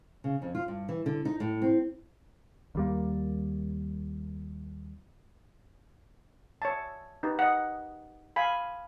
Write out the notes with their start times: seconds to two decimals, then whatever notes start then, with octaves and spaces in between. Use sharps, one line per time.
0.24 C#3
0.42 F2
0.55 F4
0.68 G2
0.89 E3
1.06 D3
1.25 D#4
1.40 A2
1.62 C4
2.75 D#2 G3 A#3
6.62 C#5 E5 A5
7.23 D#4 G4 B4
7.39 D#5 F#5
8.36 F5 G#5 B5